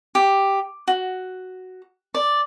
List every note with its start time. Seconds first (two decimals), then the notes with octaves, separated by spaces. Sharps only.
0.15 G4
0.87 F#4
2.14 D5